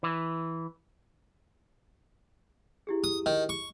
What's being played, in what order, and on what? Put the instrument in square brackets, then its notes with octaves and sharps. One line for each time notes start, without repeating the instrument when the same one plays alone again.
[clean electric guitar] E3
[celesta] E4 G4 G#4
[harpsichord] D#6
D#3
C#6